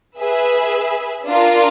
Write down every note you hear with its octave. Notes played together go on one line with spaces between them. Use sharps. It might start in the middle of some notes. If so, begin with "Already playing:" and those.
G#4 B4 E5
D4 F4 A#4